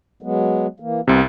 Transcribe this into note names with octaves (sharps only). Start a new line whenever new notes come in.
F#3 G#3 B3
E3 A#3
C2 C3 B3